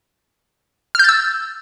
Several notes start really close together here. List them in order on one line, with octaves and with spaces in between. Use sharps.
F6 G6 A6 E6